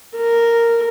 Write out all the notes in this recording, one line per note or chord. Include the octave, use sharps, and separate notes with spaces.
A#4